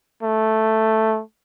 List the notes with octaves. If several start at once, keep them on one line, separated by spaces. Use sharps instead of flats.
A3